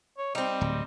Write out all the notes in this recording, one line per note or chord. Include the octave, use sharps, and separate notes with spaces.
C#5
G3 C4 D#4
D1